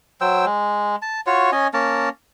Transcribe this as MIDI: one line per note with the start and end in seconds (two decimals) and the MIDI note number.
0.21 0.45 54
0.21 0.45 72
0.21 0.45 79
0.21 0.45 88
0.45 0.96 56
1.02 1.20 81
1.27 1.51 65
1.27 1.51 66
1.27 1.51 73
1.52 1.67 61
1.52 1.67 75
1.52 1.67 80
1.74 2.09 58
1.74 2.09 61
1.74 2.09 70
1.74 2.09 81